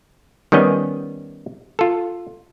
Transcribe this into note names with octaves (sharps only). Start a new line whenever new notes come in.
D#3 G3 B3 C#4 D#5
F4 A4